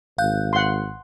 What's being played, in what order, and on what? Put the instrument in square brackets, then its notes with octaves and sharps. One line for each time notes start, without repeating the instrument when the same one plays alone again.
[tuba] G#1 [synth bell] F5 F#6 G6
[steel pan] F#5 C6